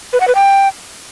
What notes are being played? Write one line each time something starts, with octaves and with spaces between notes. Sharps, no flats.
B4
F#5
B4
G5